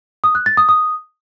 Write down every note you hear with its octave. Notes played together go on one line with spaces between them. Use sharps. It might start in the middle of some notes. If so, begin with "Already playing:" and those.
D#6
F#6
A6
D#6
D#6